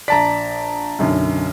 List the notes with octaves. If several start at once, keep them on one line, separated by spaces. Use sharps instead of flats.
A#1 D5 A5 A#5 B6
B1 F#2 D3